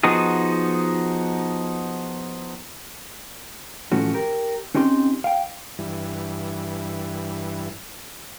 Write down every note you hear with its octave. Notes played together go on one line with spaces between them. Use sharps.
F3 B3 D#4 F#4 G#4
A2 E3 F3 A3 C#4 F#4
G4 A#4
C4 C#4 D#4 G4 C6
F5 G5
G2 E3